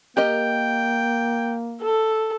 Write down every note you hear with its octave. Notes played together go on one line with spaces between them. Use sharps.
A#3 G4 A#4 D#5 G5
A4